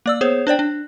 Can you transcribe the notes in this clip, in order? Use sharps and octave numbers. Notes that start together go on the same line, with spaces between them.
A#3 D5 E6
B3 G#4 C5 C#5
D4 C5 D5 G5
D4